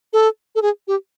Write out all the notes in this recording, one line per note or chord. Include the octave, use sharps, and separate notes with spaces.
A4
A4
G#4
G4